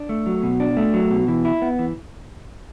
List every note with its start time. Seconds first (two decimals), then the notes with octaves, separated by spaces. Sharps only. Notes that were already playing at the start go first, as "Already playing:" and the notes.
Already playing: D4
0.09 A3
0.26 F#3
0.43 B2
0.60 D4
0.77 A3
0.94 F#3
1.11 B2
1.28 E3
1.45 E4
1.62 B3
1.79 E3